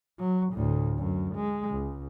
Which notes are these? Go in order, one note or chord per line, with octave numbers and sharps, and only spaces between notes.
F#3
D2 A2
F#2
G#3
C#2